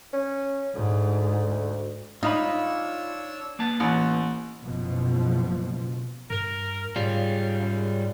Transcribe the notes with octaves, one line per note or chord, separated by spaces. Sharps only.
C#4
D2 G#2
D4 D#4 F4 C#5 F5 B5 E6
A#3 B3 A5
A1
F#1 B2 F3
G2 A#4
G#2 C#3 G3 F4
F#2 C#3